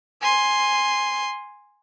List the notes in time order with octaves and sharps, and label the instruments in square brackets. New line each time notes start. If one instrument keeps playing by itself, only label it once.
[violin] G#5 C6